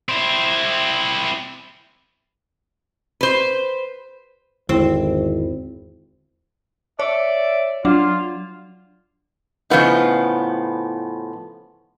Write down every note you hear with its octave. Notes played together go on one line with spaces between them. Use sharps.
C4 E4
B4 C5
G#1 E2 D3 C4 E4
C#5 D5 E5
F#3 D4 F4
A2 C#3 F3 B3 D#4